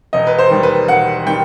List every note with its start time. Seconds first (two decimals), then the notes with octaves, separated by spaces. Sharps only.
0.13 E1 D#5
0.27 B4
0.39 C5
0.50 D#2 D#3 G3
0.63 B4
0.88 E1 F#5
1.25 D#3 G3 G5